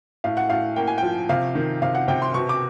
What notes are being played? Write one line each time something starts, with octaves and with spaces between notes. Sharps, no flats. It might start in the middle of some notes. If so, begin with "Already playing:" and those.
A2 F5
F#5
A2 F5
A#3 G5
G#5
F3 G5
C3 F5
D#3
C3 F5
F#5
C3 G5
C6
B2 C#6
D6